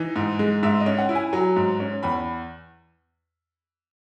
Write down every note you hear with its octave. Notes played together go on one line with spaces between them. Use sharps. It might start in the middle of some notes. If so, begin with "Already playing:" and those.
Already playing: E3 D#4
G#2
G#3
G#2 E5
D#5
C#4
F#5
E4
G#5
F#3 G#5
G#2
C#4
E2 B5